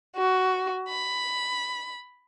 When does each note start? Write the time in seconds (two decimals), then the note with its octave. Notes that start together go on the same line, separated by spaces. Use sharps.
0.17 F#4
0.89 B5